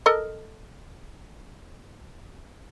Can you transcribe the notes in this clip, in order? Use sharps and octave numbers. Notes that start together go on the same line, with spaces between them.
A4 A#4 D#5